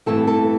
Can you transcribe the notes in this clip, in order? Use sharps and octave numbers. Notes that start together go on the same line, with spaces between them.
G2 E3 A3 C4 A4
A4